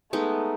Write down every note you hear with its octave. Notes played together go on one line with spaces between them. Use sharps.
G#3 A3 B3 D#4